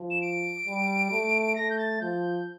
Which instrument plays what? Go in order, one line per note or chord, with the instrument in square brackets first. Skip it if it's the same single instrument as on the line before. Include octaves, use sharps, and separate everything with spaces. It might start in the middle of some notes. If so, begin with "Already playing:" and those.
Already playing: [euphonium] F3
[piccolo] E7
D7
[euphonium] G3
A3
[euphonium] A3 [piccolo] A#6
[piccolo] G6
A6
[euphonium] F3 [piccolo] G6